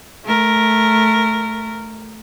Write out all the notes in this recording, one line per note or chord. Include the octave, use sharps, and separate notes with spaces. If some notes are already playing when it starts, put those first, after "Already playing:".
A3 A#4